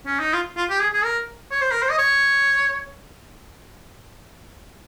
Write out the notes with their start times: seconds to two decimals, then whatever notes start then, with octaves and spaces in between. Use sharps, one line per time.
0.06 C#4
0.19 D#4
0.33 F4
0.57 F4
0.70 G4
0.80 G#4
0.93 G#4
1.04 A#4
1.51 C#5
1.61 C5
1.71 A#4
1.82 C5
1.91 D#5
1.98 C#5